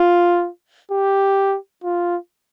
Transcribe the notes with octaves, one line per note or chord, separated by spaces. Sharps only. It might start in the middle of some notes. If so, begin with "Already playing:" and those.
Already playing: F4
G4
F4